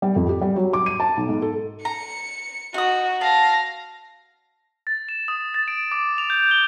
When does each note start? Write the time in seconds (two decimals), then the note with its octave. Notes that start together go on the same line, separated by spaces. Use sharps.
0.02 G3
0.16 F2
0.29 G4
0.41 G3
0.56 F#3
0.73 D6
0.86 D#7
1.00 A5
1.17 B1
1.29 G#2
1.42 A4
1.85 A#5 C#7
2.74 D#4 F#4 D#6
3.21 F5 A5 A#6
4.87 A6
5.09 E7
5.28 D#6
5.54 A6
5.68 D7
5.92 D6
6.18 F7
6.30 G6
6.51 G7